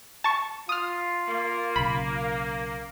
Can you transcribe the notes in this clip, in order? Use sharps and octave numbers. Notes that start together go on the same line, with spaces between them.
A5 C#6
F4 D#6 F6
A#3
B1 C#3 B5